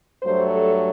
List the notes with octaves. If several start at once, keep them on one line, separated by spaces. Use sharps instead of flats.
G2 F#3 A3 C5
A4